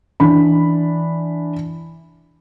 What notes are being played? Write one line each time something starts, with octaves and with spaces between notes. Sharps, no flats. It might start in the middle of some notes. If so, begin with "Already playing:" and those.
E3 D4 B5